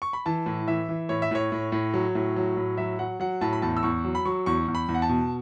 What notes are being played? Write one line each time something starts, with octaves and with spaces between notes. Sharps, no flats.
C#6
B5
E3 A5
A2
E3 E5
E3
A2 C#5
E5
A2 C#5
A2
A2
F#3
A2
F#3
A2
F#3 E5
F#3 F#5
F#3 F#5
A2 A5
B5
E2 A5
E6
E2 C#6
F#3
B5
F#3 C#6
E2 C#6
E2
B5
E2
F#5
A5
B2